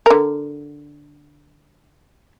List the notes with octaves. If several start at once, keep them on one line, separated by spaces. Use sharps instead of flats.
D3 A#4